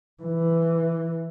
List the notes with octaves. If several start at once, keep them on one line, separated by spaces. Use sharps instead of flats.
E3